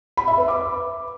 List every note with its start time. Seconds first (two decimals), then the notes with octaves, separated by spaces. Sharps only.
0.17 B5
0.28 E5
0.38 B4
0.48 D6